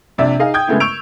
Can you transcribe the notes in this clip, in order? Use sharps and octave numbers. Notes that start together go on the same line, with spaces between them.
A#1 C3 D4 D5 E5
D#4 G#4 D#5 F5
G5 D#6 G6 G#6
C#3 G#3 A3 B3 E4
C#6 E6 G6 D7 F7